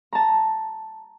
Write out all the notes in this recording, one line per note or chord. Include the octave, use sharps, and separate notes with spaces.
A5 A#5